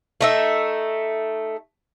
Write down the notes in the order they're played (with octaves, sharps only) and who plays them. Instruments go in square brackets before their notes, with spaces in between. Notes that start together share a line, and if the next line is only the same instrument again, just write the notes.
[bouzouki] A3 D#4 E5